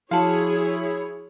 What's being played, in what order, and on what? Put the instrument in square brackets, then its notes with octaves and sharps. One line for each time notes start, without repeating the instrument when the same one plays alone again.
[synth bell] F3 F#4 [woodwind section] E4 [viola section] G#4 C#5 [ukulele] F5 A5